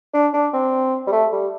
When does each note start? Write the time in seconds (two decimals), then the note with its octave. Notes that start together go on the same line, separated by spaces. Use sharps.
0.13 D4
0.33 D4
0.53 C4
1.07 G3
1.12 A3
1.32 G3